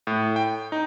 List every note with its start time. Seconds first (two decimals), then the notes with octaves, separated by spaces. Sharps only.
0.07 A2
0.36 G5
0.72 D#4